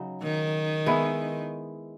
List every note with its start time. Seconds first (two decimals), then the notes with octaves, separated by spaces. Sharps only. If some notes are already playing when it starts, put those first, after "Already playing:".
Already playing: C#3 F#3 D#4
0.22 D#3
0.86 G#3 B3 E4